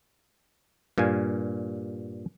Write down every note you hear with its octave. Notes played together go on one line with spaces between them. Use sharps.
G2 A#2 F5 G#5